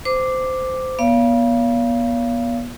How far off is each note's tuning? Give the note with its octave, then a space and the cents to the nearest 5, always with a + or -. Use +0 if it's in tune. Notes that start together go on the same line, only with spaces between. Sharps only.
C5 -20 D6 +0
B3 -35 C#5 +45 F5 -25